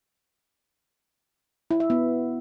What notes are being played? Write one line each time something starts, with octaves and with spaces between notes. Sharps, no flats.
E4
E5
B3